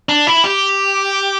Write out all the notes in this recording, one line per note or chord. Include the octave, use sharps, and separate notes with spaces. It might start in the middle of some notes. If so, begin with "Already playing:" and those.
D4
E4
G4